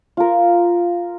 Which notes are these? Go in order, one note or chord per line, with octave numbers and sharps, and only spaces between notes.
F4 A#4